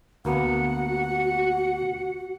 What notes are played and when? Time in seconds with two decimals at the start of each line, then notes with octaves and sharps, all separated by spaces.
0.25 D2 A#3 B3 F#4 F#5